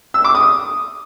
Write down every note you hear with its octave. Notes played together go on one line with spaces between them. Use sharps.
E6
D6
D#6